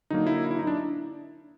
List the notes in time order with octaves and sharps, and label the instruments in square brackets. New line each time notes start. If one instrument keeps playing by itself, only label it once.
[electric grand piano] D3 F#3 A#3 D#4
E4
E4
D#4
D4